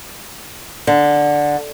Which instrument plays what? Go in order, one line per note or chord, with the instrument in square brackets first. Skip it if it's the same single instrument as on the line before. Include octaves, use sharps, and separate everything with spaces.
[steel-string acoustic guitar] D3